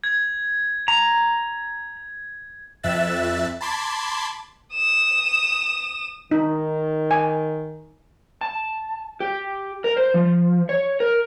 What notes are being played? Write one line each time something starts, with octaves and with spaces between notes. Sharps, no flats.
G#6
A#5
F2 E5 E6 F#6 A6
A5 B5 C6 D6 G#6
D#6 E7
D#3 D#4
G#5
A5
G4
A#4
C5
F3
C#5
A#4